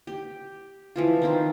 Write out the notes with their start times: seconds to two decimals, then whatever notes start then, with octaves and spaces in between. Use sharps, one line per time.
0.07 G4
0.96 E3 F3 F4
1.22 D#3 C4 F4